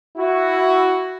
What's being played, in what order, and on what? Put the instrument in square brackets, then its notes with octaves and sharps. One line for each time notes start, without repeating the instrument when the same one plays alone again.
[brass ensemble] E4 F#4